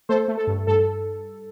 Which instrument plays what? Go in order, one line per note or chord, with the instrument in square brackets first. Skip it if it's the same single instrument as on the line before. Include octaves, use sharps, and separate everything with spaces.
[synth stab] A3 A4 C5
A3
A4
G2
G2 A4